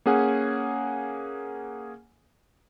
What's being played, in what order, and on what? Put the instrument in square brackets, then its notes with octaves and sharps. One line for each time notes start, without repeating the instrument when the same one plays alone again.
[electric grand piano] A#3 C#4 G#4 F#5 G#5